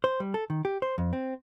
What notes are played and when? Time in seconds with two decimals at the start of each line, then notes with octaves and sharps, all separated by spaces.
0.04 C5
0.20 G3
0.34 A4
0.50 D#3
0.65 G4
0.82 C5
0.98 F2
1.13 C4